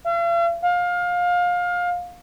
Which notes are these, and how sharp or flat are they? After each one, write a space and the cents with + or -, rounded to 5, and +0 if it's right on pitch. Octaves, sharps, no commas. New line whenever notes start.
F5 -45
F5 +25